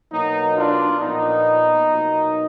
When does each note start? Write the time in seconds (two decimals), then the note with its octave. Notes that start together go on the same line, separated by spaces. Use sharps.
0.12 B2 F#3 A#3 D#4
0.56 D4 F4
1.01 A#2 F3 B3 D#4
1.90 B2 F#3 A#3